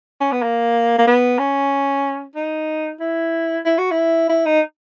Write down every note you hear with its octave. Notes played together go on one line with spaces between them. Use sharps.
C#4
B3
A#3
A#3
B3
C#4
D#4
E4
E4
F#4
E4
E4
D#4